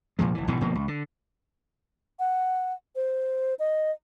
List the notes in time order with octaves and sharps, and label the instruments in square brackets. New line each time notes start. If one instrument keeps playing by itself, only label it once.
[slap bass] F1 A#2 F3 G#3
F1 E3
A#1 G#2 B2 E3
G1 B2 F3 A#3
C#2
D3
[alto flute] F#5
C5
D#5